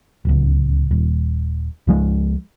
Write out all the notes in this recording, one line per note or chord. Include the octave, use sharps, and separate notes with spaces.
D1 C#2
D#1
C#2 F3 G#3